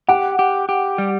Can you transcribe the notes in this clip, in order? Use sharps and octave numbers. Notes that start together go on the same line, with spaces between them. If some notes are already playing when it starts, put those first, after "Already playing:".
G4 F#5
G4
G4
G3